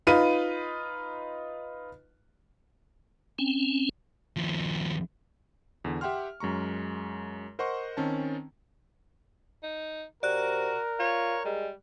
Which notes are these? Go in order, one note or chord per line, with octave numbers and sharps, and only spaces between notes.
D#4 F4 B4 D#7
C4 C#4
D#2 F3
E2 D3
G4 E5 F#5 G5 C6 F6
F#2 G#3 A#5 C#6
A#4 C5 D#5 F#5 C6 C#6
D#3 C4 C#4 A5
D#4
C3 F#4 A#4 D5 F#6
F4 C#5
G3 G#3